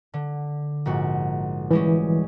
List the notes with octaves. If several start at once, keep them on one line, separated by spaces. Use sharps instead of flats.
D3
A#1 G#2 F#4
E3 G3 G#3 C#4